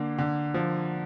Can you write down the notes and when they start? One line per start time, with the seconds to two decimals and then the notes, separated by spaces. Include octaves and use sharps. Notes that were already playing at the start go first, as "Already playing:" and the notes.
Already playing: D3 A#3
0.19 D3
0.54 F3